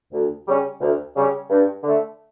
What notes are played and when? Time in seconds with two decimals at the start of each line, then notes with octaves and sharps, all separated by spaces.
0.12 D2
0.47 C#3 G3 C#4
0.80 D2
1.15 C#3 G3 C#4
1.49 G2
1.83 D3 A3